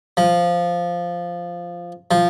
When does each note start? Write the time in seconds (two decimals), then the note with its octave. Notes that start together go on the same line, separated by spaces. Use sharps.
0.17 F3
2.11 F3